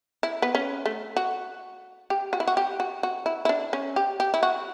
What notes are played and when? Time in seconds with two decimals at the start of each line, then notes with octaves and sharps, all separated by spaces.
0.23 E4
0.42 B3
0.55 C#4
0.86 A3
1.16 F#4
2.10 G4
2.33 F#4
2.40 E4
2.47 F#4
2.57 G4
2.80 F#4
3.03 F#4
3.26 E4
3.45 E4
3.49 D4
3.73 C#4
3.96 G4
4.20 G4
4.34 E4
4.43 F#4